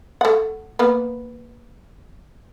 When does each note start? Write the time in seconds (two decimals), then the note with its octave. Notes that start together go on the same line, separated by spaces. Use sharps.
0.21 A3 F#5
0.79 A#3 B3